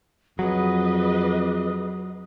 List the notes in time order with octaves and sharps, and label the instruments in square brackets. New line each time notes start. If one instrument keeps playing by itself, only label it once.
[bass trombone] F2 [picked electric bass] F#3 [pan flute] G#4 [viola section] B4 D#5